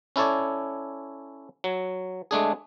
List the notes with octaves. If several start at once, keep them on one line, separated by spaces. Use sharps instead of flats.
C#4 E4 A4 C#5 D5
F#3
G#3 A3 D4 G#4